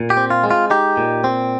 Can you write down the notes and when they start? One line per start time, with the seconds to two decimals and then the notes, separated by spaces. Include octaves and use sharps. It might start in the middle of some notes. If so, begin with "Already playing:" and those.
Already playing: A#2
0.10 G4
0.17 C4
0.30 F4
0.44 G#3
0.51 F4
0.70 D#4 G4
0.97 A#2
1.24 C4